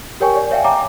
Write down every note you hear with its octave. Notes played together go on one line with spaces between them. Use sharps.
G4 A#4 C#5 G5 G#5 C#6
D5
C#5 E5 F5 G5 G#5
E5 G5 A5 A#5 D6